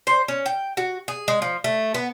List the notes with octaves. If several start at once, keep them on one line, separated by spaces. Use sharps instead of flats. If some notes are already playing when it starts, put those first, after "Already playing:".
C5
C#4
G5
F#4
G#4
G#3
F3
A3
B3